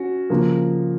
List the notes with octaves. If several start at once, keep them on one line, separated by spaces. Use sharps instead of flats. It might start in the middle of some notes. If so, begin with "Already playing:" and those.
Already playing: C#4 F#4
C#3 F3 A#3